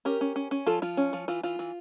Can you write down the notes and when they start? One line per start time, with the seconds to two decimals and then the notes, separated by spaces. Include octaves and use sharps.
0.05 C#4 G4 A#4
0.21 C#4
0.36 C#4
0.51 C#4
0.66 F3 F4 A4
0.82 F3 F4
0.97 C#4
1.13 F3
1.28 E3 F4
1.43 E3 F4
1.59 E3